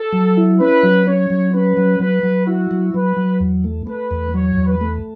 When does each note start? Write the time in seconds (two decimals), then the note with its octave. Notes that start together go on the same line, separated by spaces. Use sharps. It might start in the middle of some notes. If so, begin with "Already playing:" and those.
Already playing: A4
0.13 F#3
0.37 E4
0.59 C#4 B4
0.83 F#3
1.06 C#4 C#5
1.30 F#3
1.53 C#4 B4
1.77 F#3
2.00 F#3 B4
2.23 F#3
2.46 E4 F#4
2.71 F#3
2.94 F#3 B4
3.17 F#3
3.40 E2
3.64 A3
3.87 A3 B4
4.11 E2
4.34 F#3 C#5
4.57 E2
4.66 B4
4.81 A3